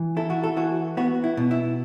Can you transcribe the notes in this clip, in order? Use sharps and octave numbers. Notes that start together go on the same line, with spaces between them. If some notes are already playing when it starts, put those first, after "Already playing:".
Already playing: E3
E4 A4
F#4
A4
E3 F#4
B3 F#4
E4
B2
E4